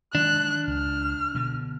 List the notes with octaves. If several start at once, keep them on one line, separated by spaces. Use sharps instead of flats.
D#3 F#3 G#3 D4 F#6
C#2 F6
B2 D3